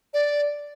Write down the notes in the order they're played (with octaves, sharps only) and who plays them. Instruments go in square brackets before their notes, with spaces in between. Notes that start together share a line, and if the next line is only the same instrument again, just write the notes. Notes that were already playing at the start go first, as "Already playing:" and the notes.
[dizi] D5